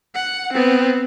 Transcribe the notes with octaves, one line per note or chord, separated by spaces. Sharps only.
F#5
B3 C4